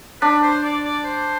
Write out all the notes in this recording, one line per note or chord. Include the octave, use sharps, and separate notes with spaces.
D4 B4
C5
D5
D5
C5